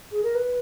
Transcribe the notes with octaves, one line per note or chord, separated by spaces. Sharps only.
G#4
A#4
B4